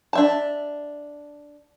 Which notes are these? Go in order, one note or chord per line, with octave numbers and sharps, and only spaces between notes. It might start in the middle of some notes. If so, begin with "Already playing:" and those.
D4 E5 A5